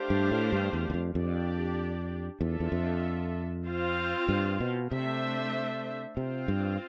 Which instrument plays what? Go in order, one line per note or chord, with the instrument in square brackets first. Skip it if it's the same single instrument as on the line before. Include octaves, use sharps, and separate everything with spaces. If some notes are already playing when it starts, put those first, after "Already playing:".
Already playing: [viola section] A3 D4 G4 C5 F5
[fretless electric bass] G2
A2
G2
E2
E2
F2
[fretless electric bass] F2 [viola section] D4 G4 D5
[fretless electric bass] E2 [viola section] D4 F4 A4 E5
[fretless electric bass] E2
F2
[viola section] C4 F4 C5 F5
[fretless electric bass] G2
B2
[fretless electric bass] C3 [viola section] A3 D4 A4 C5 E5
[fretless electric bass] C3 [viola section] C4 F4 C5 F5
[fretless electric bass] G2